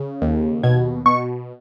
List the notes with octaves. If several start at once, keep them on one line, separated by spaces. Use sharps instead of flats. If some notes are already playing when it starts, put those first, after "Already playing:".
Already playing: C#3
D#2
B2 G#6
B2 C#6